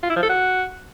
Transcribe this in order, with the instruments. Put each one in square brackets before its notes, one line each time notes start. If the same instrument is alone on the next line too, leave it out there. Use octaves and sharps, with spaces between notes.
[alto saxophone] F4
E4
F3
A4
F#4